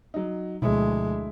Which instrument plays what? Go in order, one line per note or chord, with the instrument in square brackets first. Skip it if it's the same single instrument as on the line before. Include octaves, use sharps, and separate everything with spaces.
[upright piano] F#3 D#4
[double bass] D2 G#3 [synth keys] B2 F3 [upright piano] E4